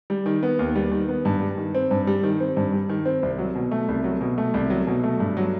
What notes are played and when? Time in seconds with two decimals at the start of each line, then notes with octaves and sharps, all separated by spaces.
0.10 G3
0.26 D#3
0.43 B3
0.59 D#2
0.76 G3
0.91 D#3
1.09 B3
1.25 G2
1.41 G3
1.57 D#3
1.75 C4
1.91 G2
2.07 G3
2.23 D#3
2.40 C4
2.57 G2
2.73 G3
2.89 D#3
3.06 C4
3.23 C2
3.39 F#3
3.55 B2
3.71 A3
3.88 C2
4.04 F#3
4.21 B2
4.38 A3
4.54 C2
4.70 F#3
4.87 B2
5.04 A3
5.20 G2
5.37 F#3